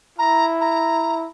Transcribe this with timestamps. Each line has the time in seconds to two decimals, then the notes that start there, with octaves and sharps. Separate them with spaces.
0.18 E4 A#5
0.61 A#5